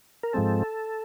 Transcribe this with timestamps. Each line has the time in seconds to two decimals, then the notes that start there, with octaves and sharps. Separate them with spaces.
0.23 A#4
0.33 G#2 F3 G#3 C4 A4